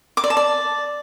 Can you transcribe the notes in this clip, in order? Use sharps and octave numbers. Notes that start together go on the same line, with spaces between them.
D6
D5
A5
D5